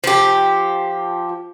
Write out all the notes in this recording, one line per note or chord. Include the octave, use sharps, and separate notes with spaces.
F3 G4